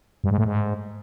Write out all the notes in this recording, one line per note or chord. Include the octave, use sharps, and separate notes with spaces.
G2
G#2
A2
G#2